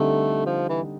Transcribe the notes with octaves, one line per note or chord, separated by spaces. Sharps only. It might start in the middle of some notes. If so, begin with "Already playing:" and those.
Already playing: D3 G3 A3 C4 D#4
F3
E3